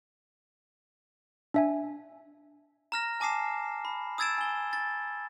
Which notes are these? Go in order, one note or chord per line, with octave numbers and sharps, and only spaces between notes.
D4 E5 G#5
A#5 F6 A#6
G#5 A5 D6 D#6 C7 E7
B5
D#6 E6 G#6 A6 D7 E7
G#5 G7
A6